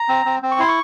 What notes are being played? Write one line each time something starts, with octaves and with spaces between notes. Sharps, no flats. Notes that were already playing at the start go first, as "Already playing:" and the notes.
Already playing: A#5
C4
C4
C4
C#6
E4 C6
C#6